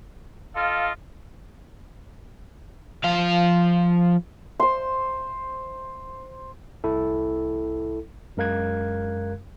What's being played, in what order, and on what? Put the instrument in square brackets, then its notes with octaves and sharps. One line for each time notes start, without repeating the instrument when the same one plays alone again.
[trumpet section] F4 A4 D#5 [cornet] F5
[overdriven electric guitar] F3 F5
[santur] C5 C6
[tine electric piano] C2 E4 A4
F#2 G#3 A#4 F5 F#6 G#6